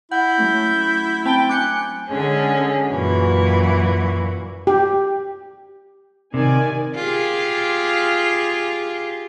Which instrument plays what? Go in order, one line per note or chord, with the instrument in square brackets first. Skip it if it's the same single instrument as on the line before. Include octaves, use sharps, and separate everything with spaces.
[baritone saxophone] E4 [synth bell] F#5 [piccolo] G6
[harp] F#3 A3 C#4
[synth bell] C4 A5 B5 [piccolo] G5
[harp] D4 G#5 [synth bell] D6 G6 C#7 [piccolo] F#6
[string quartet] D3 G#3 C#4 G#4
F#2 A#2 E3 F#4
[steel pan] G4
[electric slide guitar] C3 [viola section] D#3 D5 G#5
[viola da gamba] F4 G4 G#4